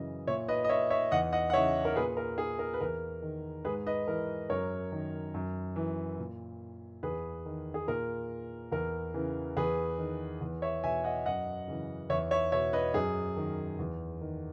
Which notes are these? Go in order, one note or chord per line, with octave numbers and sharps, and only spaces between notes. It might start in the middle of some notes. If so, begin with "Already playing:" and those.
Already playing: F#2 C#3 E3 D#5
A#2 C#5 E5
B4 D#5
D#5
C#5 E5
C#5 E5
E2 D#5 F#5
D#5 F#5
F#5
C#3 E3 C#5 E5
A#4
A#2 G#4 B4
A#4
G#4
A#4
B4
E2 A#4
D#3
G#2 G#4 B4
B4 D#5
E3 A#4
F#2 A#4 C#5
D#3
F#2
E3
A#2
E2 G#4 B4
D#3
G#4
A#2 A#4
E2 A#4
C#3 E3
E2 G#4 B4
D#3
E2
C#5 E5
B2 E5 G#5
D#5 F#5
F#2 D#5 F#5
C#3 E3
E2 C#5 E5
C#5 E5
B2 C#5 E5
B4 D#5
F#2 G#4
D#3
E2
D#3